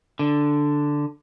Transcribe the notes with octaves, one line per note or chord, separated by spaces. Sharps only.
D3